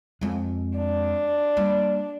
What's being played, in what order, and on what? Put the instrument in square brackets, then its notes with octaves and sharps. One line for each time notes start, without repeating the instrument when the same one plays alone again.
[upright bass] F2 G#3
[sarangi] D4
[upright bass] G3 A#3